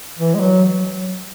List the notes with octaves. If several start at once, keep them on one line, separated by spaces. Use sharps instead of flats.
E3
G#3
F#3